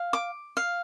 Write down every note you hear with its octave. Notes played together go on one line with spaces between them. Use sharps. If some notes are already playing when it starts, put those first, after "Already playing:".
Already playing: F5
D6
F5